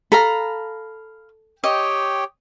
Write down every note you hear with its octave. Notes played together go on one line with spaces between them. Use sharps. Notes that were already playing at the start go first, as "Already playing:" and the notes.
A4 F5 A#5 B5
G4 C#5 D#5 G5